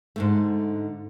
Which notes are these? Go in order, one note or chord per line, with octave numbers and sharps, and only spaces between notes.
G#2 D3 A3